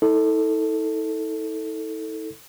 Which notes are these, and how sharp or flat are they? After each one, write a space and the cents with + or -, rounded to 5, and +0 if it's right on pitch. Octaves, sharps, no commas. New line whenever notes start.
E4 -45 A4 +5